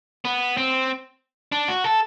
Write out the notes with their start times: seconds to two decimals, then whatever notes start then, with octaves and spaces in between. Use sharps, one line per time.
0.25 B3
0.57 C4
1.52 D4
1.68 F#4
1.84 A4